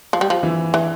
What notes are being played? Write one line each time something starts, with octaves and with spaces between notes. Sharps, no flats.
F3
G3
F3
E3 E4
E3